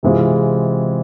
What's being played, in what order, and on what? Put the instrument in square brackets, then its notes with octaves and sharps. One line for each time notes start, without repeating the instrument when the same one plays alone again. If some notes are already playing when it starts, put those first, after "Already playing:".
[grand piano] C3 E3 G#3 C4 F4